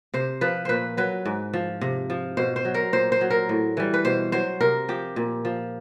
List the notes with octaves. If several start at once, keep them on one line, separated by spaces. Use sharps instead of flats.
C3 C5
F3 B4
A#2 B4 C5
F#3 B4
G#2
F3
C3
F3
B2 C5
C5
F#3
A#4
A#2 C5
C5
F#3
A#4
A2
E3 G3
B4
B2 C5
F#3 C5
C3 A#4
F3 G4
A#2
F3